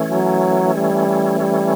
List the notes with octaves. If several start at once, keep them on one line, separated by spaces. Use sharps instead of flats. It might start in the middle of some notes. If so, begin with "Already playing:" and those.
Already playing: E3 A3 C#4
F#3
G3
G3